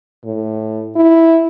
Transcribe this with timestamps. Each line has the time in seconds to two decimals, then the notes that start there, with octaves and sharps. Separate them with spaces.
0.24 A2
0.96 E4